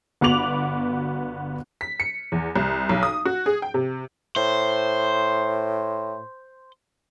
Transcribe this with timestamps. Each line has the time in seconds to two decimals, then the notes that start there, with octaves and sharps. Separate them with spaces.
0.21 G1 B3 F#4 D6 F7 F#7
1.81 B6
2.00 C#7
2.32 E2
2.56 C2
2.89 B1
3.03 D#6
3.25 F#4
3.46 G#4
3.62 G5
3.74 C3
4.36 A2 C5